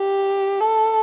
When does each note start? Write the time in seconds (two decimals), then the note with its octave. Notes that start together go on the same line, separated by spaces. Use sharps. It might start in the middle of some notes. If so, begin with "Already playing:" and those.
Already playing: G4
0.60 A4